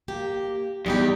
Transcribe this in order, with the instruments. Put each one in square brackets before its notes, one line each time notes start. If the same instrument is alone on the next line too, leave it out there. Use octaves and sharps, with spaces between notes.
[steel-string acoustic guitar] A#3 G4
[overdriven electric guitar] E2 [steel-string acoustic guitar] G3 D#4 G4